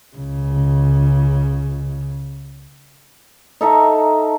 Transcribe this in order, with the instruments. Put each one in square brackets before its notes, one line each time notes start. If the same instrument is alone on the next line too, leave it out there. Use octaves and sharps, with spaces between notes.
[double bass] C#2 C#3
[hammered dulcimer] D#4 A4 E5 A#5